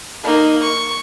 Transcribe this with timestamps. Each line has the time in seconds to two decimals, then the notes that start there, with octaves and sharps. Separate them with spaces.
0.23 A#3 D#4
0.62 C#6